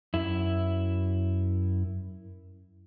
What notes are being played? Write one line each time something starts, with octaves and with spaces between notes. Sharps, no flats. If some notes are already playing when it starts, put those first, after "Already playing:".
F#2 E4